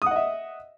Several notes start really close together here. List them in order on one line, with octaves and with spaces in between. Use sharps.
D#6 F#5 D#5 E5